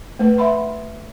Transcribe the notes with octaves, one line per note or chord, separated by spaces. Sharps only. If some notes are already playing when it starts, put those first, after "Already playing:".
A3 B4
E5 F#5 B5 C6